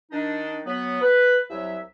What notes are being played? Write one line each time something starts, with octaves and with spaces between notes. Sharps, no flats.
D#3 D4 D#4
F#3 B3
B4
C2 F#3 E5